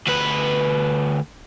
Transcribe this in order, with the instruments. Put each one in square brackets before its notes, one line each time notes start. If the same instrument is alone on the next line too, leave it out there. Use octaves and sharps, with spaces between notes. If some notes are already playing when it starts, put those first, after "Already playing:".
[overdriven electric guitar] D2 B4